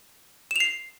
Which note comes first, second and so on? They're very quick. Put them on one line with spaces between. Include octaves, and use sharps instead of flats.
E7 F7 C7